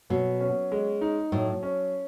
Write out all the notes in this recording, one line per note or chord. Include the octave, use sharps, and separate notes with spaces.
B2 F#3
C#4
G#3
D#4
A2 F#3
C#4